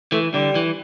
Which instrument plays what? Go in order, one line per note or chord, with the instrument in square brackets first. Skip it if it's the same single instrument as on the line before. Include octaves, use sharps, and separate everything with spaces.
[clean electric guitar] E3 [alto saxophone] A3
[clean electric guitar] D3 [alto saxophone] G3
[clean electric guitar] E3